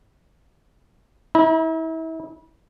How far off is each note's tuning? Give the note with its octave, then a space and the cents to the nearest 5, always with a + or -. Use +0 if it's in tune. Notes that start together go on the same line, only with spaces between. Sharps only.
E4 -35 A#5 +45